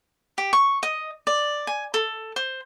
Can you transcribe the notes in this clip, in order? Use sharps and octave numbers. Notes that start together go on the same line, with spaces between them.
G4
C#6
D#5
D5
G#5
A4
C5